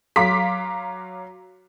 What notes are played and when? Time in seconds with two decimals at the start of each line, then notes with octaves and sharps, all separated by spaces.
0.16 F#3 F5 A#5 C6 D6 B6